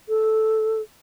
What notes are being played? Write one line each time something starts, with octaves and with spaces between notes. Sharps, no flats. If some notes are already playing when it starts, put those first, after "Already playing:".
A4